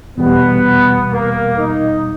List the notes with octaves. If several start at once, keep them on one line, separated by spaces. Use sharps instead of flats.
E2 B2 G3 B3
A#3
D#4